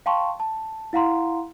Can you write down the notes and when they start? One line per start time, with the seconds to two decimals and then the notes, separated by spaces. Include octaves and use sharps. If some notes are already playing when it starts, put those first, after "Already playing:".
0.06 F5 G5 A5 C6 C#6
0.40 A5
0.93 E4 F5 F#5 A#5 C6